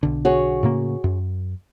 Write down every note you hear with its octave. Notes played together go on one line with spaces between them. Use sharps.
B1 D3
F#4 G#4 C#5
A2 C#3 A#3
F#2